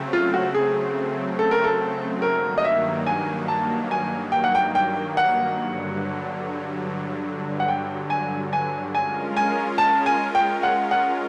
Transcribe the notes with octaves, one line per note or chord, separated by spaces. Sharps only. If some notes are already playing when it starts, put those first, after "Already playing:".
Already playing: C#3 F#3 A3 C4
F4
F#4
G#4
A4
A#4
A4
G2 D#3 F#3 A#3 A#4
D#5
E5
G#5
A5
G#5
G5
F#5
G5
G5
F#5
G2 D3 F#3
F#5
G5
G#5
G#5
G#3 C#4 F4 A#4 G#5
G#5
A5
G#5
G5
F#5
F#5